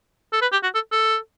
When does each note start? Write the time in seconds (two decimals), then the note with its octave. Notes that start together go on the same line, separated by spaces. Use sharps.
0.33 A4
0.42 B4
0.52 G4
0.63 F#4
0.74 A4
0.92 A4